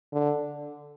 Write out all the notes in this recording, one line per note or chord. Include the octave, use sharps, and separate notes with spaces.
D3